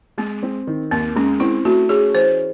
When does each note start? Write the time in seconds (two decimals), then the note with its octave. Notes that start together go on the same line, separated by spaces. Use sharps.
0.18 G#3 C4
0.43 C4
0.67 D#3
0.91 D#2 C4
1.16 G#3 C#4
1.40 C4 E4
1.65 A3 F#4
1.89 C#4 G#4
2.14 E3 C5